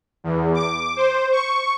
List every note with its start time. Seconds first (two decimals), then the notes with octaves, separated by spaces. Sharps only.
0.24 E2
0.54 D6
0.97 C5
1.32 C#6